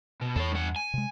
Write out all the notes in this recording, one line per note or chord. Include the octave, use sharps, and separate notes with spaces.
B2
E2 A4 C#5
G2 F#5
G#5
C3 G#3